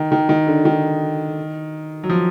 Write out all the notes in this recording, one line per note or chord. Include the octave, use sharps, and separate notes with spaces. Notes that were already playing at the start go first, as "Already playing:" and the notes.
Already playing: D#3
D#3
D#3
D3
D#3
F#3
F3